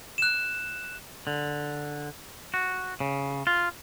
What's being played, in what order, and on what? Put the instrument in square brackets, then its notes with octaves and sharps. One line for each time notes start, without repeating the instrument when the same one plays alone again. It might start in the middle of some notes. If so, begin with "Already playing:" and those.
[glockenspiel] F#6 E7
[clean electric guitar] D3
F#4
C#3
F4